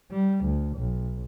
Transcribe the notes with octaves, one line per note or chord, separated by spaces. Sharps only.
G3
D2
B1